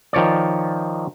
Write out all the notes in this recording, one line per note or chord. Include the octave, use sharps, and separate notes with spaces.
D#3 F3 C#5 D5